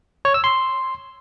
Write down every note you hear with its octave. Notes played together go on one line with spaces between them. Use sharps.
C#5
E6
C6